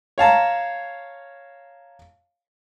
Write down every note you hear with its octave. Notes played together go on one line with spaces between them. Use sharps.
C#5 F5 A5 A#5